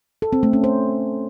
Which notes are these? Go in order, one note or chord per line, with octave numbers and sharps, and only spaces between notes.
A4
C4
A3
C#4
C5